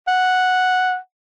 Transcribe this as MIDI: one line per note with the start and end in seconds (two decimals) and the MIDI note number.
0.08 0.97 78